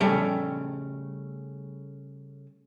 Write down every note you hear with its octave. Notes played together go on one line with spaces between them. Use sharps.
C#3 G3 A3 G5